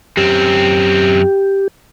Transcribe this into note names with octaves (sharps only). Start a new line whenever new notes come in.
F#2 C4 G4